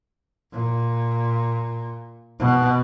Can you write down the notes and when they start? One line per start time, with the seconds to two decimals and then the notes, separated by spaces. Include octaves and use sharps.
0.52 A#2
2.39 B2